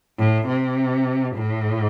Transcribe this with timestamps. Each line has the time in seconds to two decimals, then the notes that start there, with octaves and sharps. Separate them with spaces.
0.19 A2
0.48 C3
1.37 A2